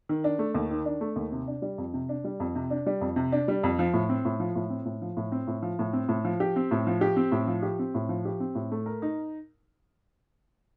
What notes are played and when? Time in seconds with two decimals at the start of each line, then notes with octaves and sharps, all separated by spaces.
0.09 D#3
0.24 D4
0.39 A3
0.54 D#2
0.71 D#3
0.85 D4
1.01 A3
1.16 D#2
1.32 C3
1.47 D4
1.62 G3
1.78 F2
1.94 C3
2.09 D4
2.24 G3
2.40 F2
2.55 C3
2.70 D4
2.86 G3
3.01 F2
3.16 C3
3.32 D4
3.48 G3
3.63 F2
3.79 F3
3.94 A2
4.09 C4
4.25 A2
4.40 F3
4.56 A2
4.70 C4
4.85 A2
5.02 F3
5.17 A2
5.32 C4
5.47 A2
5.62 F3
5.79 A2
5.93 C4
6.09 A2
6.25 F3
6.40 G4
6.56 C4
6.71 A2
6.87 F3
7.01 G4
7.16 C4
7.32 A2
7.47 F3
7.63 G4
7.79 C4
7.95 A2
8.09 F3
8.25 G4
8.40 C4
8.55 A2
8.72 A3
8.86 A#4
9.02 D#4